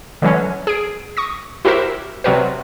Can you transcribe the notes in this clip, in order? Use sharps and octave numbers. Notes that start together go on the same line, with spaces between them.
D3 E3 F#3 C#4
G#4 D7
C#6 D#6 A#6
E4 F#4 G4 A#4 C5 E5
C3 F#3 G3 F#4 A#4 B4